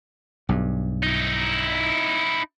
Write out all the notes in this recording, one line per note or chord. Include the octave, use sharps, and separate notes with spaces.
B1 G2
D#4 E4